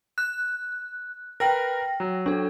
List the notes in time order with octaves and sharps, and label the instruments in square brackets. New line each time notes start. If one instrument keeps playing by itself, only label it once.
[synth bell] F#6
[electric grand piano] A#4 B4 [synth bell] G5 F6 A#6
[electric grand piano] F#3
[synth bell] D4 A4